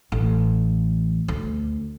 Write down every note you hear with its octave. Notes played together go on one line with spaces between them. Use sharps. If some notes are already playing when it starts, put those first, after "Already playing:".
A1
D2